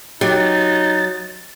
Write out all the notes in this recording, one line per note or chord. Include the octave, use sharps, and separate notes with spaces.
F#3 D#4 G4 A6